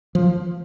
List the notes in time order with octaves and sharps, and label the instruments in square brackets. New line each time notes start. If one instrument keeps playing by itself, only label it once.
[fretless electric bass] F3